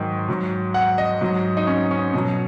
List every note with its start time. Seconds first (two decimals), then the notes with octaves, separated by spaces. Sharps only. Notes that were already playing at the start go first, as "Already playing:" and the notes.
Already playing: G#2 D#3 F#3
0.28 G#2 F#3
0.74 F#5
0.98 D#5
1.21 G#2 F#3
1.57 D#4
1.67 C#4
1.91 C#4
2.13 B2 F#3